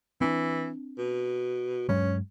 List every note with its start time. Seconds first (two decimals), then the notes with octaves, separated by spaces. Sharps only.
0.21 E3 C4 D4
0.98 B2
1.89 G2 F#3 G#3 C#4